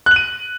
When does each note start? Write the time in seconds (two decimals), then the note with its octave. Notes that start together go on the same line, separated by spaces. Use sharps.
0.06 F#6
0.11 F#7
0.16 D#7